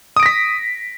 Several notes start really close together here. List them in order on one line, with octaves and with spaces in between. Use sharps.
D#6 D7 A#6 B6